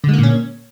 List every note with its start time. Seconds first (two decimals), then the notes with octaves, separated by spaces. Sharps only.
0.04 D3
0.09 G#3
0.13 A#3
0.18 A#2
0.23 C#4